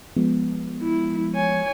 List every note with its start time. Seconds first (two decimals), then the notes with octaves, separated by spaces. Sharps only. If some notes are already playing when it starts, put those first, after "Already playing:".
0.16 F3 G#3 B3
0.82 E4
1.35 C#5 G#5